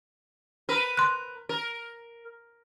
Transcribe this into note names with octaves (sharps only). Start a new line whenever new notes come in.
A#4 B4
C6 F#6
A#4